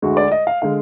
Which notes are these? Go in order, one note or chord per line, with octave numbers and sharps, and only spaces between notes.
D2 D3 G#3 F#4
D5
D#5
F5
D3 G#3 F5